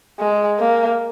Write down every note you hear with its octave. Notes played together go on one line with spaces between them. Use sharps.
G#3
A#3